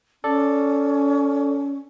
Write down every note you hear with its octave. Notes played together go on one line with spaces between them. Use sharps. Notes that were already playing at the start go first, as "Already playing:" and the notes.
C#4 A4 D5